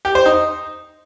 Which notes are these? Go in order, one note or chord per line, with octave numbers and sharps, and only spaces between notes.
G4
C5
D#4